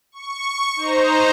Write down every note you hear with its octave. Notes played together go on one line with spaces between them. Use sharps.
C#6
D#4 C5 A#5